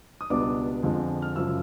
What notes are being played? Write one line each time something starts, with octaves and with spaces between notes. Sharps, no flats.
D#6
C#2 B2 G3 B3 D4 D6
F2 D3 F3 G#3
F6
F#2 C#3 F3 E6